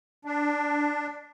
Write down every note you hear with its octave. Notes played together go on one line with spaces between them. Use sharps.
D4